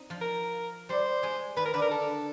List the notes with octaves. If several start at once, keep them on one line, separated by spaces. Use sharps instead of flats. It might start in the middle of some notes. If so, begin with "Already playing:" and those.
Already playing: C4 D#4
F3 F4
A#4
G3 G4 C5
G#3 G#4
D#3 D#4 B4
A#4
D3 D4 B4
A#4
A4